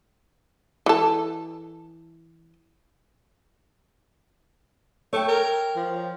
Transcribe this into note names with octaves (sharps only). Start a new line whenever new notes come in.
E3 A4
A3 C#5 G5
A#4
F3